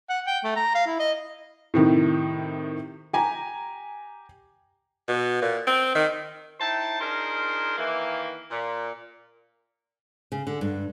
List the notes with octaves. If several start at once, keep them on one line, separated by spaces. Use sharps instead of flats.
F#5
G5
A3
A#5
F5
E4
D#5
A2 C3 D#3
G4 G#5 A#5
B2
A#2
C4
D#3
D#4 E4 C5 G5 A5
D4 D#4 F4 G#4 A#4 C5
D#3 E3 A#3
A#2
C#3
D3
G2